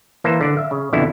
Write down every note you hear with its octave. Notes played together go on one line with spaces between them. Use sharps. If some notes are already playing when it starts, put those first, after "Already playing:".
E3 A#3 C5 A5
D3 D5
E5 F5
C#3
F2 B2 D3 E4